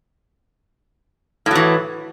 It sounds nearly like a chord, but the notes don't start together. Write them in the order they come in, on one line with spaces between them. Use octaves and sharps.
A2 F#3 E3